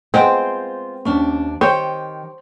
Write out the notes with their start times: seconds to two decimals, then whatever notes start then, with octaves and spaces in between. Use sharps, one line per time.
0.14 G#3 B3 C4 F4 C5 G5
1.05 D#2 C#4 D4
1.61 D#3 G4 C5 C#5